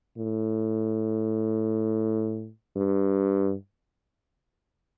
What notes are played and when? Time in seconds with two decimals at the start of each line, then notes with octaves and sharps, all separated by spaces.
0.18 A2
2.77 G2